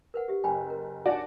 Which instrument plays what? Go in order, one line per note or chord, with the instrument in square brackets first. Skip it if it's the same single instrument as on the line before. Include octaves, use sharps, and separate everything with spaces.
[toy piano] A#4 B4 F#5
G4 E5
[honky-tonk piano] F#1 [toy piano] G5 G#5 B5
[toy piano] A#4
[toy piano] D4 D#4 C#5 [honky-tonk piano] F#4 D5 F#5